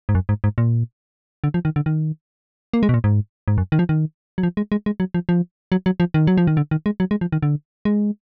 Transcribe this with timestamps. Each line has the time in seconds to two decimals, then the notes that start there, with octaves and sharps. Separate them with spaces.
0.09 G#2
0.15 F#2
0.29 G#2
0.44 G#2
0.58 A#2
1.44 D3
1.54 F3
1.65 D#3
1.76 D3
1.86 D#3
2.74 A#3
2.83 G#3
2.89 B2
2.94 A#2
3.04 G#2
3.48 G#2
3.58 F#2
3.72 D#3
3.79 F3
3.89 D#3
4.38 F#3
4.43 F3
4.57 G#3
4.72 G#3
4.86 G#3
5.00 F#3
5.14 F3
5.29 F3
5.72 F#3
5.86 F#3
6.00 F3
6.14 D#3
6.27 F#3
6.38 F3
6.47 D#3
6.57 D3
6.71 D#3
6.86 G#3
7.00 F#3
7.11 G#3
7.21 F3
7.32 D#3
7.43 D3
7.85 G#3